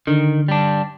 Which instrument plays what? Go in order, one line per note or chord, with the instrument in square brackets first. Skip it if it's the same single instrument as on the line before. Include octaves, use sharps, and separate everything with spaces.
[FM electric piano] D3 [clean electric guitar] D#3
[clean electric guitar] G3 D4